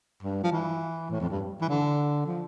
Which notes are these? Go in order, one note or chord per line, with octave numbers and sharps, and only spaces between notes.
G2
F3
E3
A2
F2
G2
E3
D3
F3